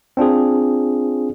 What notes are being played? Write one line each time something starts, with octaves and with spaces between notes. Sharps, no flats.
C4 D4 F4 G#4